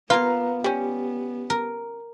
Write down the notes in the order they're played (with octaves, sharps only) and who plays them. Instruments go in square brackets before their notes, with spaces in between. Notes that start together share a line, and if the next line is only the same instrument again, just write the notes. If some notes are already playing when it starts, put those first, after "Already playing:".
[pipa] A#3 F5 [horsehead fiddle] B3 [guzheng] F4 [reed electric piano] B4 A#5
[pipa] G3 C#4 [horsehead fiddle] B3 [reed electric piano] G4
[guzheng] A#4